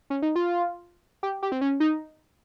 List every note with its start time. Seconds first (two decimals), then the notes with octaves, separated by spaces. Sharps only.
0.10 C#4
0.22 D#4
0.35 F4
1.23 G4
1.43 G4
1.52 C4
1.61 C#4
1.80 D#4